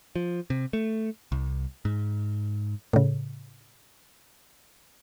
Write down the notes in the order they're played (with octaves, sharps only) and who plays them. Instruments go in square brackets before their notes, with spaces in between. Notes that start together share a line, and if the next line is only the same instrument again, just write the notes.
[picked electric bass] F3
C3
A3
C2
G#2
[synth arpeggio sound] A2 C#3